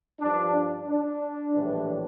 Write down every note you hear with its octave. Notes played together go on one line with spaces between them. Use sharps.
G2 F3 D4
D4
D4
A#1 A2 E3 G3 D4